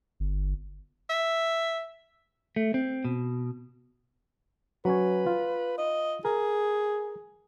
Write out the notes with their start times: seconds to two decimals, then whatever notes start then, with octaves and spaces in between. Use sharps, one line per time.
0.20 G1
1.09 E5
2.56 A3
2.74 C4
3.04 B2
4.85 F#3 C#4 B4 C#5
5.26 F4
5.78 D#5
6.25 G#4 A#4